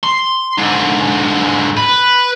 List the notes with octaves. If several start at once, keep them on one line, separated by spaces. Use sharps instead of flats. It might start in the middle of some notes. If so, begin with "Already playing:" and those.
C6
G#2 D3
B4